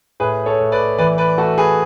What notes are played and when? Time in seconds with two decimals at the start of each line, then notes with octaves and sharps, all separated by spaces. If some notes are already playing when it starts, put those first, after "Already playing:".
0.20 A2 G#4 B4
0.46 A4 C#5
0.59 A2
0.72 B4 D5
0.98 E3 B4 D5
1.18 B4 D5
1.38 A3 F#4 A4
1.57 G#4 B4